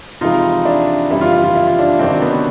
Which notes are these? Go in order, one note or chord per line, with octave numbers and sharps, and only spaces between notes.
F2 C3 E3 G#3 D#4 F4
D4 E4
F#1 F2 C#3 E3 G3 E4
F4
E4
F4
E4
F4
D4 E4
C#2 C3 D#3 F#3 C4 D4
B3 C#4